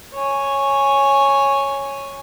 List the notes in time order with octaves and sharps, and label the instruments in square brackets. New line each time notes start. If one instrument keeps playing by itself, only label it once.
[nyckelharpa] C#5 G#5